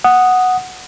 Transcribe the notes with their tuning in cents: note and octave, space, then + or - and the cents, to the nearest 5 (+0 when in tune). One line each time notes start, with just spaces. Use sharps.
F#5 +0 D#6 +0